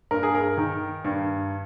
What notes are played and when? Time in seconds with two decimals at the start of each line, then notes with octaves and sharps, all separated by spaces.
0.11 G2 A#4
0.23 G#4
0.35 A#4
0.57 D#3
1.04 G2